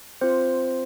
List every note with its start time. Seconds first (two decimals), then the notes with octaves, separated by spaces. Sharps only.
0.21 C4 F4 C5